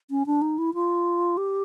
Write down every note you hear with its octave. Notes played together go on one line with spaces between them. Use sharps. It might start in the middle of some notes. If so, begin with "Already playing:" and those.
C#4
D4
D#4
E4
F4
G4